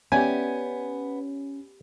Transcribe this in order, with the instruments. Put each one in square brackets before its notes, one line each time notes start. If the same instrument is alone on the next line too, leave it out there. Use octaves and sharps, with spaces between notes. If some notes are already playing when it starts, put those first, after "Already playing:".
[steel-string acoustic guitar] B3 [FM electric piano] C#4 [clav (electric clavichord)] G4 D5 E5 [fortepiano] G#5